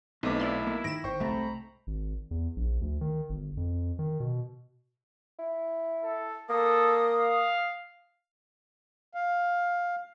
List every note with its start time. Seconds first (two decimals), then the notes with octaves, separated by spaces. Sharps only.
0.23 B1 B2 A3 C4 D#4 B4 D6
0.40 E4 D5 F5 C6
0.63 B2 A#3
0.84 G#2 D#3 A#6 D7 E7
1.04 G#1 C5 G5 C#6
1.20 C2 G#2 A3 C4 A#5 B5
1.87 G#1
2.31 E2
2.56 A#1
2.81 D2
3.01 D#3
3.30 G1
3.57 F2
3.99 D#3
4.20 B2
5.39 E4
6.03 A4
6.49 A#3 A4 D#6
7.16 F5
9.14 F5